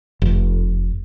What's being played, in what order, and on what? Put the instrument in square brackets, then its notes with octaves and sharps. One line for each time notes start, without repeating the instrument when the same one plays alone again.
[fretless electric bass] F1